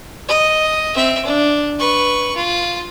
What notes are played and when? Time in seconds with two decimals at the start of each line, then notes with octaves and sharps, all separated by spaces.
0.29 D#5
0.95 C4 E5
1.25 D4
1.79 B4 C#6
2.36 F4